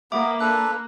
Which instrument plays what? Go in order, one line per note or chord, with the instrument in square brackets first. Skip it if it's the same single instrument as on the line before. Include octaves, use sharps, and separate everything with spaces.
[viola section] A#3 [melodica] B3 [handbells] E5 D6
[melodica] D4 A4 B4 [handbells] F#6